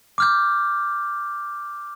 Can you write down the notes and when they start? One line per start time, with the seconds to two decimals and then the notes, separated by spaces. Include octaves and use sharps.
0.18 D6 F6 G6